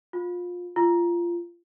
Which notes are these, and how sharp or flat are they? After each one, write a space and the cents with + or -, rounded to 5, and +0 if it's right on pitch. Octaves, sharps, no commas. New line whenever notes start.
F4 +25
F4 -20